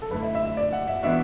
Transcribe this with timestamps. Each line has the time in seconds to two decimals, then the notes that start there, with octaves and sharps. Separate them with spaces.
0.02 A4
0.11 F#2 D3 A3 E4 B4
0.22 E5
0.35 E5
0.45 E5
0.57 D5
0.73 F#5
0.88 E5
1.03 E3 B3 D4 F#4 E5